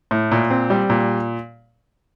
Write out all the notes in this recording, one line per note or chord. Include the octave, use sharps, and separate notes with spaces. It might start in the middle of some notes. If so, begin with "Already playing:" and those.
A2
A#2
C4
G3
A#2